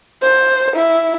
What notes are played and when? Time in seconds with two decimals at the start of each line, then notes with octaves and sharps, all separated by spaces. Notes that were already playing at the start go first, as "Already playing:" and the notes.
0.22 C5
0.76 E4